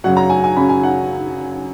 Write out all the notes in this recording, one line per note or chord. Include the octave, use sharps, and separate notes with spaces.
F#2 C#3 F#3 C#4 F#5
A#5
G#5
G#5
F#2 C#3 F#3 C#4 B5
G#5
F#5